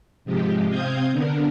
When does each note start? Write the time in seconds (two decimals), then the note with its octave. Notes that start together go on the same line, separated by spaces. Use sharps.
0.25 G#2 C3 F3 G#3 G4
0.69 C3 C4 F5 D#6 G6 G#6
1.12 D3 B3 D4 A#4